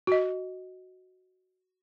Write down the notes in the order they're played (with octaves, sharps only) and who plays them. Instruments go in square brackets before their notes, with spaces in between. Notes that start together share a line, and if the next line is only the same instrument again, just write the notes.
[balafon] F#4 D#5